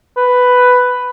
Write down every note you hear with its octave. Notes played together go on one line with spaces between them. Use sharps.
B4